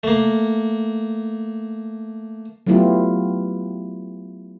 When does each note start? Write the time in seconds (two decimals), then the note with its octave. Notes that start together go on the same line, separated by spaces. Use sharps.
0.03 A3 A#3
2.66 F#3 A3 B3 E4 F4 G4